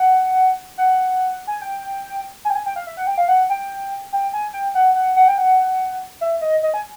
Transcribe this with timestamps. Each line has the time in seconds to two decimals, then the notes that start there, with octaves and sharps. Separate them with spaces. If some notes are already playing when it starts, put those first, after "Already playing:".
Already playing: F#5
0.78 F#5
1.47 G#5
1.62 G5
2.45 G#5
2.50 G5
2.55 G#5
2.66 G5
2.76 F5
2.87 E5
2.97 F#5
3.07 G5
3.18 F5
3.28 F#5
3.50 G5
4.13 G5
4.33 G#5
4.53 G5
4.75 F#5
4.95 F#5
5.16 F#5
5.28 G5
5.38 F#5
6.21 E5
6.41 D#5
6.63 D#5
6.74 G#5